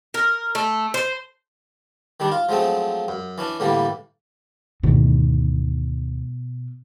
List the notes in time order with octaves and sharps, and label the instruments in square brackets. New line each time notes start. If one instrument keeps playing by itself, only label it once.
[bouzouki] A#4
A3
C5
[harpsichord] D#3 G3 D4
F4
F3 F#3 G#3 A3 C4
F#2
E3 C#4 D4
A2 D3 E3 G3 A#3
[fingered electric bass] D2 G#2 D#3 [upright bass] B2